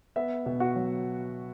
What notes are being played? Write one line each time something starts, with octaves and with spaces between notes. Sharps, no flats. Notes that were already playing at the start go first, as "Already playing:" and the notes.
B3 E5
B2
F#4 F#5
F#3